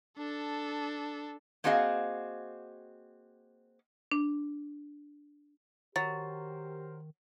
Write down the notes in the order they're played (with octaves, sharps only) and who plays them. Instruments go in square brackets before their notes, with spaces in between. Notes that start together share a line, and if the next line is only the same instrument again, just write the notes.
[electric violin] D4 A4
[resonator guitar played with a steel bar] A#3 C4 F#4 G#4 D#5 F5
[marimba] D4
[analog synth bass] D#3 [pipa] F#3 [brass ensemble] G4 A#4 C5 [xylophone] A6